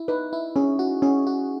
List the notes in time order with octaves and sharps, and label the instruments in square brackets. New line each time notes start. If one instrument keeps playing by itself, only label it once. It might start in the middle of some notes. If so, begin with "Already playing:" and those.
Already playing: [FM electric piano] E4
[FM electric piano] D#4 [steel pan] B4
[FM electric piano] E4
[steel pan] C#4 [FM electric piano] G#4
[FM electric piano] F#4
[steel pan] C#4 [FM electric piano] G#4
[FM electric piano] F#4